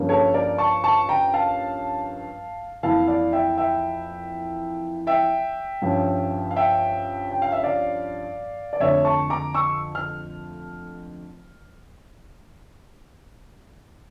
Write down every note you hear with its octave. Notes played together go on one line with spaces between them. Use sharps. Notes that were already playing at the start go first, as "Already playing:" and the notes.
Already playing: G2 F3 A#3 C#4
A4 C#5
A#4 D5
A5 C#6
A5 C#6
G5 A#5
F5 A5
F2 E3 A#3 E4 F5 A5
D5 F5
E5 G5
E5 G5
E5 G5
G2 F3 C#4
F5
E5 G5
G5
F5
E5
D5 F5
D5
F2 D3 A3 C#5 E5
A5 C#6
A#5 D6
C#6 E6
F6